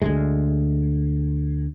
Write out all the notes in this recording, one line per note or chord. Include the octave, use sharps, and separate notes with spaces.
D2 G#3